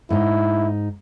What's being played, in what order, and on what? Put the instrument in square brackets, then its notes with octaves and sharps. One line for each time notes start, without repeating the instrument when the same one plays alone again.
[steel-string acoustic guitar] G#2 D#4 [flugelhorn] E4